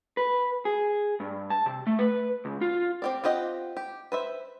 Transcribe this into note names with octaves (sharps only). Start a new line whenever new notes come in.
B4
G#4
G2
A5
C3
A3
B4
C#2
F4
C4 G4 D5
C4 F4 G4 D#5 F#5
G4
B4 C5 E5